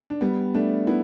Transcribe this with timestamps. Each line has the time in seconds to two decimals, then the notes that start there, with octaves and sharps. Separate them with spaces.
0.10 D4
0.21 G3 B3
0.54 A3 D4
0.87 B3 E4